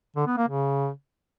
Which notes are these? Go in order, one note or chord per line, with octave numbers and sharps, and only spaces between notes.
D3
B3
A#3
C#3